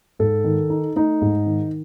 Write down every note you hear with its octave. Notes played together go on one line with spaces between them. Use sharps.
G#2 A4
D#3
D#4
A3 D#4
G#2
D#3